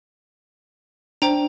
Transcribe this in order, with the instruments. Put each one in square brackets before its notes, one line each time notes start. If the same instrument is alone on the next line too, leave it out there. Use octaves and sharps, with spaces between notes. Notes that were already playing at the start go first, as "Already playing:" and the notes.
[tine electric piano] D4 [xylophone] C5 G5 A#5